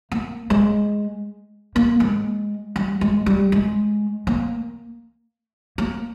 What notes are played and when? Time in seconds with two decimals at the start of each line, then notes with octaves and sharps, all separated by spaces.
0.12 A#3
0.50 G#3
1.76 A#3
2.00 G#3
2.76 G3
3.01 G#3
3.26 G3
3.52 G#3
4.27 A#3
5.78 A#3